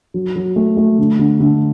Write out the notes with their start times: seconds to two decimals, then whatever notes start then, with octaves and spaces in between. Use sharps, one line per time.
0.14 F#3
0.36 F#3
0.56 A3
0.77 A3
0.99 D3
1.19 D3
1.40 D3